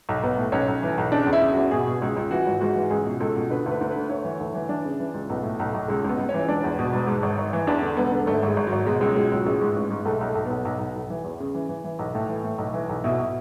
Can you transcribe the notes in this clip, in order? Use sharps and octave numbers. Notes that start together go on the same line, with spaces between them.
B1
B1 B3
A2
B1 C#4
B1
E3
B1
C#3 D4
E2
E4
C#3
E2 F#4
B2 G#4
B2
C#2
C#2
E3 F#4
G#1
G#2 F#4
E3
C#2 G#4
B2
C#2 A4
B2
D3 B4
D2 B4
D2
B4
D3
D2 C#5
E3
D2
E3
E3 D4
C#3
E3
C#2
B1 B3
A2
B1
B1
C#2 G#3
C#2
B3
C#2
C#4
E3
E1 D4
E2
B2
E1
G#2
G#1
G#1
E3
E2 D4
D3
E1 B3
D3
G#1 A3
G#1 G#3
G#1
F#3
G#1
B2 G#3
C#2 G#3
F#3
B2 G#3
C#2 F#3
A1 G#3
G#2
A1
G#2
B1 A3
B1
A3
B1
B1 B3
B1
B1
B1
E3
E2
C#3
E3
E3
E3
B1
A2
E3
A2
B1
E3
B1
B2 E4
B2